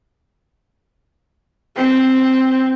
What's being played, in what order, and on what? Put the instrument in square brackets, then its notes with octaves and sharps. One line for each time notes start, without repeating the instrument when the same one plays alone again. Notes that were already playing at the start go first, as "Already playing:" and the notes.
[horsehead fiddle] C4